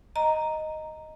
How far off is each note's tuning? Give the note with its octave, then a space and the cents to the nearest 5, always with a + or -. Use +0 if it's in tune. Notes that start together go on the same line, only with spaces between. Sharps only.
D#5 +0 A#5 -5